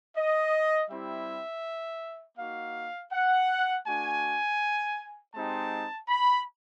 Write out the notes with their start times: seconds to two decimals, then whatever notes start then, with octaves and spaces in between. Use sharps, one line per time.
0.16 D#5
0.90 G3 C4 E4 G4 E5
2.38 A#3 D#4 F#4 F5
3.12 F#5
3.86 A3 D4 F#4 G#5
5.34 G#3 C4 D#4 G4 A5
6.08 B5